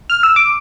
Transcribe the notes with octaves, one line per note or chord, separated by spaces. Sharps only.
F6
E6
D6